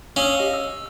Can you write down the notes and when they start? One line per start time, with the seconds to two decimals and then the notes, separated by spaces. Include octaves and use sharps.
0.16 C#4 F5 D#6 E6
0.39 G4 D#5 F5
0.54 E6